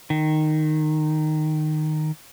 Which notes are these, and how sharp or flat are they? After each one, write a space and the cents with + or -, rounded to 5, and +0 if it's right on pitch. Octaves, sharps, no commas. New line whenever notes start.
D#3 -10